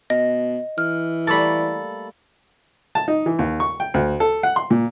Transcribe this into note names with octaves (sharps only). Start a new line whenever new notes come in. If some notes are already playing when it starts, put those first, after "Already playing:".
B2 D#5
E3 F6
G3 A3 A#3 A4 B5
A5
D#4
E3
D#2
C#6
G5
D2
A4
F#5
C6
A#2